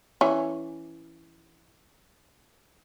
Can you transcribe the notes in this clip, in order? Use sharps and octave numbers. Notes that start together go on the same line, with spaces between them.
E3 C#4